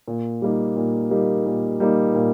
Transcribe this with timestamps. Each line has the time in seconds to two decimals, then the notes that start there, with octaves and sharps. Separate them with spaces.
0.08 A#2
0.42 G3 A#3 D#4
0.77 A#2
1.11 G3 A#3 D#4
1.46 A#2
1.80 G3 A#3 D#4
2.15 A#2